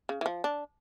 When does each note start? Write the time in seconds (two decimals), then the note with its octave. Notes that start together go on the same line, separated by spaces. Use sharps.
0.09 C#3
0.21 E3
0.26 F3
0.44 D4